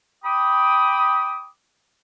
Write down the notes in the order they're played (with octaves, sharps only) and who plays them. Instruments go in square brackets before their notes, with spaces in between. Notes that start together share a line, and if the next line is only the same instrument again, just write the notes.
[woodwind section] G5 B5 D6 D#6